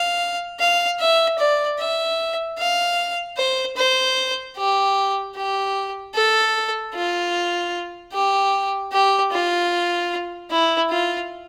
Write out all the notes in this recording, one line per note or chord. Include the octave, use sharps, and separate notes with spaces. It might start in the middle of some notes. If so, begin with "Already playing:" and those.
Already playing: F5
F5
E5
D5
E5
F5
C5
C5
G4
G4
A4
F4
G4
G4
F4
E4
F4